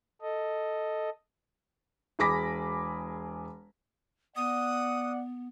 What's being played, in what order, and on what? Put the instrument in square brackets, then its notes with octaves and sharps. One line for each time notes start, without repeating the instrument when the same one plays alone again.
[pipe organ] A4 D#5
[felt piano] E1 G#4 B5 D6 A#6 B6
[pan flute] B3 [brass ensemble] D5 F#5 [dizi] D#6